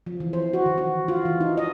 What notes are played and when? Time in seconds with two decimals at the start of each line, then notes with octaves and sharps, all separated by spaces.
0.06 F3
0.20 E3
0.33 C5
0.53 F#4
0.66 D#3
0.78 F#4
1.08 F4
1.25 E3
1.41 D#4
1.57 D#5